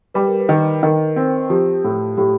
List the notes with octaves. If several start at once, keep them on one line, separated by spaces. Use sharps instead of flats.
G3 B4
A#4
B4
D#3
D#3 A#4
C4
F3 G4
A2
A2 G4